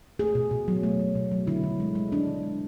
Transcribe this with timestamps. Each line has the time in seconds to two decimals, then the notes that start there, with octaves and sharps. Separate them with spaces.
0.19 A3 G#4
0.35 B2
0.51 B2
0.68 F#3
0.83 A3
0.99 B2
1.15 B2
1.32 F#3
1.47 D3 E4
1.63 D3
1.80 G#3
1.95 G#3
2.12 D3 D4
2.27 D3
2.43 G#3